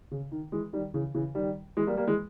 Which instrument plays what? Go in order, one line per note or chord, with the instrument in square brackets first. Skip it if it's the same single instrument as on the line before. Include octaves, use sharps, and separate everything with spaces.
[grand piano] C#3
D#3
E3 G#3
D#3 G3
C#3 E3
C#3 E3
D#3 G3
E3 G#3
G3 A#3
G3 A#3
E3 G#3